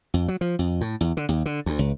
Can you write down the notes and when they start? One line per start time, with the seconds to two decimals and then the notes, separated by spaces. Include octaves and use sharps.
0.14 F2
0.28 F#3
0.41 F3
0.59 F2
0.81 A2
1.01 E2
1.17 D3
1.29 D#2
1.46 D3
1.66 D2
1.79 C#2